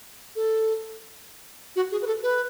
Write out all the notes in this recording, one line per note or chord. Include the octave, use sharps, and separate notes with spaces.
A4
F#4
G#4
B4
A4
B4